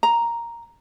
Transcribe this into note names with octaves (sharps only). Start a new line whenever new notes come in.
A#5